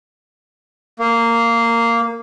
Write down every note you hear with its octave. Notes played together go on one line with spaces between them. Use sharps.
A#3